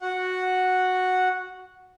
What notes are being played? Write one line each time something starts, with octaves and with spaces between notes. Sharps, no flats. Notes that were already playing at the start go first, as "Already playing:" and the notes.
F#4 F#5